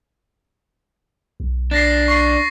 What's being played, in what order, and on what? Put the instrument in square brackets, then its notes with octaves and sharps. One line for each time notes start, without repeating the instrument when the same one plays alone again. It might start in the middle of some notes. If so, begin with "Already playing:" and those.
[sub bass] B1
[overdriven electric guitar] D4 [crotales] A6 A#6 C7
[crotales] C#6 C7